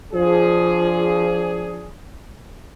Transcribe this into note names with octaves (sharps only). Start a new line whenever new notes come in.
F3 D4 G#4